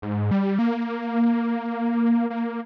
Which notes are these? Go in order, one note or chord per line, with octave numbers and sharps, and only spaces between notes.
G#2
G3
A#3
A#3